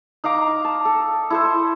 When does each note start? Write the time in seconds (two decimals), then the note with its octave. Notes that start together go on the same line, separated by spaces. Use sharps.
0.24 D#4 F5 A#5 D6
0.65 A5
0.85 A4
1.30 E4 A4 C5